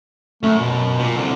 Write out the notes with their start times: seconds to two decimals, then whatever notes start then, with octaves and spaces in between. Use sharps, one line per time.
0.43 F#2 A3
0.59 B2
0.99 A#2
1.17 C2 D3